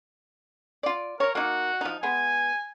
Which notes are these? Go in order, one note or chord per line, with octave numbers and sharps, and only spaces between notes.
F4 D5
A#4 C#5
A#3 D#4 F#4
F3 D#4
G#3 B3 G#5